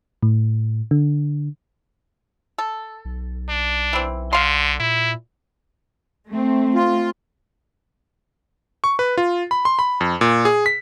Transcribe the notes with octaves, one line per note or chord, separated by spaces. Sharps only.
A2
D3
A4
B1
D4
E3 C4
D3 F5 C6
A#2 E4
A3 C4
F4
C#6
B4
F4
B5
C6
B5
F2
A#2
G#4
B6